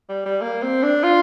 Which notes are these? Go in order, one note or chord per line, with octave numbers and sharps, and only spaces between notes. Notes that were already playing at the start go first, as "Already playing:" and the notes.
G3
G3
A#3
C4
D4
F4